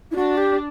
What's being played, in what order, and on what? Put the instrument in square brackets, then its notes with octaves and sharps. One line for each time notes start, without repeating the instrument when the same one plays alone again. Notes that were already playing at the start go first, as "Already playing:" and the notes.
[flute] E4
[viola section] D4 [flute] F#4
[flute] G4